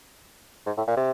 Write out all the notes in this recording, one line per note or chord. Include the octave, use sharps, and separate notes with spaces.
G#2
A2
A#2
C3